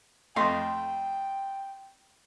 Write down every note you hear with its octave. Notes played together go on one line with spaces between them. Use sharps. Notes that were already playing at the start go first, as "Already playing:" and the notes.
F2 A3 D#5 F5 G5 C6